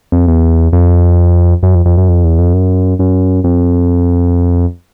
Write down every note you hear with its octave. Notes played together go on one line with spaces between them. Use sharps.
F2
E2
F2
F#2
F2
F2
F#2
F2
E2
F2
F#2
F#2
F2